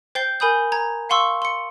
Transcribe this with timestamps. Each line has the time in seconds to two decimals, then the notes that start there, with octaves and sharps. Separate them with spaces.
0.15 C5 G5 G6 A6 C7 G7
0.40 A#4 G#5 B5 D#6 G6
0.72 A#5 G#6
1.09 F5 F#5 C6 C#6 E6
1.42 C6 C#7